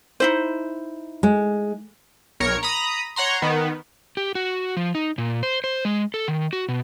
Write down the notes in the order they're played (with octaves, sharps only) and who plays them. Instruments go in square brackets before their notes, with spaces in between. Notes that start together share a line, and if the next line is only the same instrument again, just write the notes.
[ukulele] D#4 E4 C5
[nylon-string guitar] G#3
[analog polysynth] B1 A#4 C#5 C#7
A#5 B5 D#6
C#5 F#5 A#5 C6
D#3 B3
[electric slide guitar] G4
F#4
F3
D#4
A#2
C5
C5
G#3
A4
D#3
F#4
B2